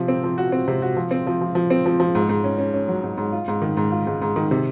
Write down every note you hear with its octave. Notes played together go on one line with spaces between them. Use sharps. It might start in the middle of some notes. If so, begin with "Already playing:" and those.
Already playing: C3 F3
C4
F3
F#4
C4
C3
F#4
F3
C4
F3
F3
F3
C4
F3
F3
G#2
G#2
C#4
C#4
C#4
F#3
G#2
G#2
F4
G#2
D#3
G#2
F4
G#2
G#2
D#3
C3